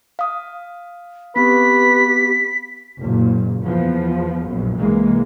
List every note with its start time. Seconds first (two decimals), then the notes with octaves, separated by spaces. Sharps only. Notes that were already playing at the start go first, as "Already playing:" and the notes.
0.19 F5 D#6
1.36 B3 C4 G4 B4 B6
3.00 F#1 A#2
3.64 E2 F3 B3
4.46 A#1 F#2
4.79 C2 E3 G#3 A#3